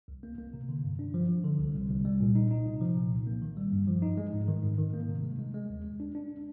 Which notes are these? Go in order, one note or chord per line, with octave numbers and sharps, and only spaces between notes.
C2
A#3
A#3
C3
D3
G2
D4
F3
F3
D3
C2
C2
C2
G3
A#2
D#4
D#4
C3
F3
A#2
C2
A#3
D#3
G3
G2
F3
D#4
G#3
G#2
D#3
G#2
D#3
A#3
C3
G#3
G#3
G#3
D#2
G#3
D4
D4